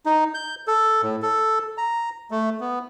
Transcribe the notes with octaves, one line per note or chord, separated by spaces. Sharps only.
D#4
G6
A4
A2
A4
A#5
A3
B3